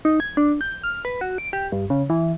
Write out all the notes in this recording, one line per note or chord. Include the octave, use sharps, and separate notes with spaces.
D#4
G#6
D4
G6
F6
B4
F#4
D7
G4
G2
C#3
E3